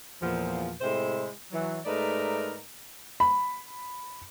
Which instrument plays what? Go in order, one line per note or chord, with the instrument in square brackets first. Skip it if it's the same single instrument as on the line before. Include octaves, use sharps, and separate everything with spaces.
[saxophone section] E2 A#2 F3
A2 C3 G#3 E4 C5
E3 F#3
G#2 A3 D#4 A#4 B4 D5
[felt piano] B5